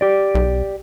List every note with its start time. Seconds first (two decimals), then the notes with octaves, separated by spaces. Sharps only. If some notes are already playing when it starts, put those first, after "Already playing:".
0.01 G4 D5
0.35 B1